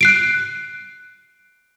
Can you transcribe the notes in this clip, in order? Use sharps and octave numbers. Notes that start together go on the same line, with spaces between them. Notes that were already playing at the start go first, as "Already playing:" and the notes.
F#6 C7 D7